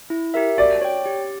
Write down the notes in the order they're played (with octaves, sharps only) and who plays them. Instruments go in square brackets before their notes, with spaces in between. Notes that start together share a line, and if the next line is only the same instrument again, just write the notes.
[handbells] E4
G4 A#4 E5
[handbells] F#4 [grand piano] D5
[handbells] C#5 G5
G4